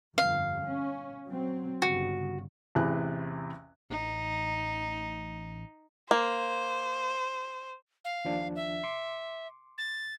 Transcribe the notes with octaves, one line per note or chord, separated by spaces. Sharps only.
G1 F2 F5
C#4
F#3 C4
G1 G2 C#3 F#4
A1 E2 C3 E4 G#5 F#6
A1 D#4
A#3 C5
F5
D#2 F3 D4
E5
C6 D6
A6